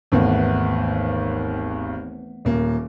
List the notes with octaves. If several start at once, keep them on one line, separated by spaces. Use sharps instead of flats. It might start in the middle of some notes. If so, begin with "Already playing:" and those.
G#1 D#2 E3 A3 B3
D#1 A#3